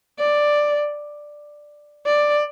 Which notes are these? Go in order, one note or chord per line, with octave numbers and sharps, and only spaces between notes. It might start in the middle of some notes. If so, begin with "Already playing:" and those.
D5
D5